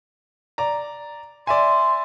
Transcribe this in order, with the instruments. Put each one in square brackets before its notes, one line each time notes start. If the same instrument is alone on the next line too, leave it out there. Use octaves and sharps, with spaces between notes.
[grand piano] D5 A#5
[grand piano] D5 E5 G#5 [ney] C6